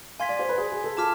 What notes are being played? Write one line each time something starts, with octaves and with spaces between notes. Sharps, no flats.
F5 G#5 C6 G#6 B6
D5
C5
B4
G#4
G#4
A4
F4 A5 D6 F6 B6